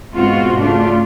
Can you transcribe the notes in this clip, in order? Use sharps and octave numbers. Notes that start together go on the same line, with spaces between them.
G#2 B2 C4 F4 F#4
C#3 A3 D4 F4